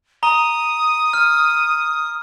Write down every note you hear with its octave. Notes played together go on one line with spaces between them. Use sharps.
A#5 D#6 G7
F6